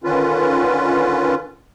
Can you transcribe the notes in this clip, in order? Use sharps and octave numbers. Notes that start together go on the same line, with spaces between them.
D3 D#3 C#4 F4 B4